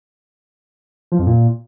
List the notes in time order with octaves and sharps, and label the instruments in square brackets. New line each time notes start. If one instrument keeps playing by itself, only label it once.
[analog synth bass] F3
F2
A#2